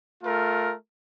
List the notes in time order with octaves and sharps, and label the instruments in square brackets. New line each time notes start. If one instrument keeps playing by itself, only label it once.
[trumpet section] A3 F4 A#4